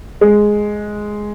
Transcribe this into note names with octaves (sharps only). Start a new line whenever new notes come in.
G#3